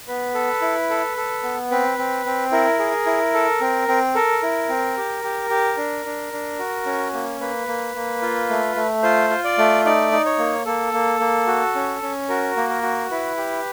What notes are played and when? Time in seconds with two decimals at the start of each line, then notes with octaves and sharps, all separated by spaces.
0.08 B3 B4
0.34 A4
0.62 E4
0.90 A4
1.17 A4
1.43 B3
1.71 C4 B4
1.98 C4
2.26 C4
2.51 E4 A#4
2.79 G#4
3.06 E4
3.34 A4
3.61 C4
3.88 C4
4.15 A4 A#4
4.43 E4
4.69 C4
4.97 G4
5.24 G4
5.50 G4
5.77 D4
6.05 D4
6.33 D4
6.59 F#4
6.86 C#4
7.14 A#3
7.40 A#3 B4
7.67 A#3
7.95 A#3
8.22 F4
8.50 A3
8.76 A3
9.03 F4 C5
9.30 F4
9.44 D5
9.58 A3
9.85 D#4 D5
10.12 D#4
10.26 C#5
10.38 A#3
10.66 A#3 A4
10.93 A#3
11.20 A#3
11.47 F#4
11.75 C#4
12.02 C#4
12.29 F#4 A#4
12.57 A#3
12.69 A#4
12.83 F#4
13.11 E4 B4
13.37 G4